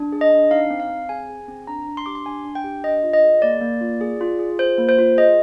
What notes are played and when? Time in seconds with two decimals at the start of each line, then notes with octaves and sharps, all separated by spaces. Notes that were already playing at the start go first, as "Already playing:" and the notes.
Already playing: D4
0.12 G#4
0.21 D#5
0.31 D4
0.51 D#4 F5
0.70 C4
0.80 F5
0.90 C4
1.09 G#4 G#5
1.29 G#4
1.48 C4
1.67 D4 A#5
1.86 D4
1.97 C6
2.06 G4 D6
2.15 C6
2.26 D4 G#5
2.45 D4
2.55 G5
2.64 G4
2.84 D4 D#5
3.03 F4
3.13 D#5
3.24 G#4
3.42 A#3 D5
3.61 A#3
3.81 F4
4.01 G#4
4.21 F4
4.39 G#4
4.59 F4 C5
4.78 A#3
4.89 C5
4.99 F4
5.17 G#4 D#5